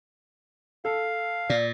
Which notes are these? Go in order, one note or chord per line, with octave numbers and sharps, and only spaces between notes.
A4 F5
A#2 D5